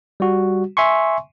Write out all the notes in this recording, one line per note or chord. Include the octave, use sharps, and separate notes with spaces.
G3 F#4
E5 G#5 C6 C#6